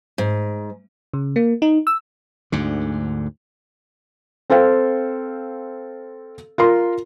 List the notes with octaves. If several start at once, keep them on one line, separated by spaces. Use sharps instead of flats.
G#2
C#3
A#3
D#4
E6
D2 G#2 D3
C4 A4 C5 F5 G5
F4 A#4 C6